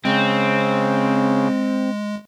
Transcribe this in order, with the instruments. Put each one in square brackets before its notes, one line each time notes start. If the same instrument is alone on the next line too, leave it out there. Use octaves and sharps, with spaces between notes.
[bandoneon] C#3 [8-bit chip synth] G#3 [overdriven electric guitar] C4